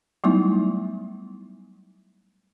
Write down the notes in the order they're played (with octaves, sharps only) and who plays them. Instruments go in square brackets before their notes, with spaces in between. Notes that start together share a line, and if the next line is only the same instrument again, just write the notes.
[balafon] F#3 G3 A3 B3 D#4 E4